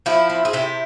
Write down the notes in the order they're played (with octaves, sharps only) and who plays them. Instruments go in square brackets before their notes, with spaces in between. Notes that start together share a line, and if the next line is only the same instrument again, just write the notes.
[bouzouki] F3 E4
C4
G#4
C3 E4 G4